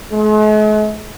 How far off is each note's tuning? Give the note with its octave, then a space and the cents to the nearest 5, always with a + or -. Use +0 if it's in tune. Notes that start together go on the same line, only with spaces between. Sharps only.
G#3 +45